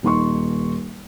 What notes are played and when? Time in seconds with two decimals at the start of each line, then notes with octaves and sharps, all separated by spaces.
0.03 D#1 D#4 C6 C#6